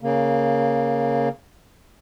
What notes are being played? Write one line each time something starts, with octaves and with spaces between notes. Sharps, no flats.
C#3 A#3